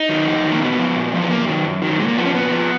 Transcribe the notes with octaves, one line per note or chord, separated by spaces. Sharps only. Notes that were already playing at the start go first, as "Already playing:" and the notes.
Already playing: D#4
D#3 F#3
F2
D#3 F#3
A#3
A#2 B3
F3
A#2
F3
B3
F#2 A#3
D#3 F#3
F#2
D#3 F#3
A#2 G#3
A#3
F3 B3
C#4
A#2 B3
F3